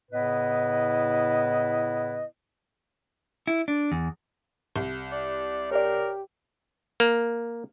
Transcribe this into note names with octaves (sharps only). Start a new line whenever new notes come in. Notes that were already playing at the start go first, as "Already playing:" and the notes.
A2 C#3 B3 E4 B4 D#5
E4
D4
E2
C2
D5
G4 A#4 C#5 D5
A#3